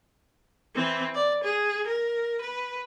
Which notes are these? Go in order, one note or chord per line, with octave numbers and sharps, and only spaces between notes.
E3 C4
D5
G#4
A#4
B4